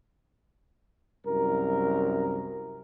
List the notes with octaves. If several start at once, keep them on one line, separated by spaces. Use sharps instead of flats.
C2 F#2 A#4